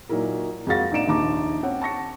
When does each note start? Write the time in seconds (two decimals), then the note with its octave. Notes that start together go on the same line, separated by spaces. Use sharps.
0.09 A#2 F#3 D#4 E4 A#4
0.67 F2 G#3 F#4 F5 A6 A#6
0.92 A#1 D#4 D5 D7 E7
1.07 A#1 D#2 D#4 A5 D6
1.63 C4 C#4 F#5
1.81 A5 C#6 A#6 C#7